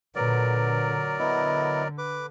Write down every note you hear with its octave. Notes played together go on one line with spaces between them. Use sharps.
A#2 D3 F#3 A#4 B4 D5
D3 B3 E4 D#5
B4 D6